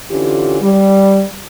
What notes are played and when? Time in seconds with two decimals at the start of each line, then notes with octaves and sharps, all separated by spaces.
0.10 D3 E3 C#4 F4 G4
0.61 G3